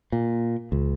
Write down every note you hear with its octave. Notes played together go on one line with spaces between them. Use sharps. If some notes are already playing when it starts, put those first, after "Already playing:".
A#2
C#2